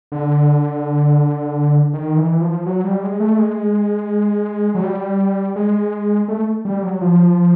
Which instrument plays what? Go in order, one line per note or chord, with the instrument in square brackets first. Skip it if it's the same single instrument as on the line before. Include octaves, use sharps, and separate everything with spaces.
[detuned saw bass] D3
D#3
E3
F3
F#3
G3
G#3
A3
G#3
F#3
G3
G#3
A3
G3
F#3
F3